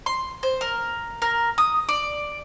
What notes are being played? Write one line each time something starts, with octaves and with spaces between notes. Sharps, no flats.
C6
C5
A#4
A#4
D#6
D5